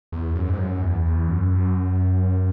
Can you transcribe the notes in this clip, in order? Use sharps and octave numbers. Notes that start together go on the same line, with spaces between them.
E2
F#2
G#2
F#2
E2
E2
F#2
F#2